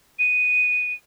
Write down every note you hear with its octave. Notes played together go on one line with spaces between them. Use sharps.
D#7